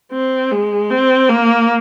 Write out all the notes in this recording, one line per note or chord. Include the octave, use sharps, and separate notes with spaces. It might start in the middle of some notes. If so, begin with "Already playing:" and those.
C4
G#3
C4
A#3